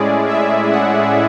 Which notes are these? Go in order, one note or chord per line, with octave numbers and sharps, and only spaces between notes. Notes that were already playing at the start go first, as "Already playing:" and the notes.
Already playing: A2 G#3 C#4 E4 G#4 D5
E5
F#5